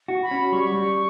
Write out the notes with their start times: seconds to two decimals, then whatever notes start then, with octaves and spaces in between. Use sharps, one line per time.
0.08 F#4
0.23 B5
0.31 C#4
0.52 G3 C#6
0.75 G3